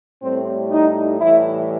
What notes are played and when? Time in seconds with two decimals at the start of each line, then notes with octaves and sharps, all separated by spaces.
0.23 A2 G3 C4
0.71 D#4
1.20 A2 E3 G3 E4